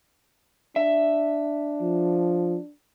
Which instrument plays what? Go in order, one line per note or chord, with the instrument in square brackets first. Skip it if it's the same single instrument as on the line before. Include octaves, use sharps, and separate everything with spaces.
[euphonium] D4 [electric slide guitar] E5
[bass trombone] F3